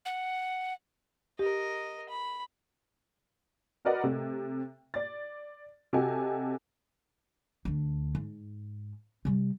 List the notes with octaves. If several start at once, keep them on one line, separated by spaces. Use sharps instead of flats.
F#5
G4 A#4 D#5
B5
F#4 A#4 B4 D5 D#5 F#5
C3 A3
D5 A6
C3 F#4 G4 A4 D#5 G#5
D2 D4
G#2
C3 G3